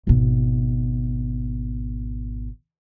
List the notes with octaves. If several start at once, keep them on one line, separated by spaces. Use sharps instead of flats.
G#1 B2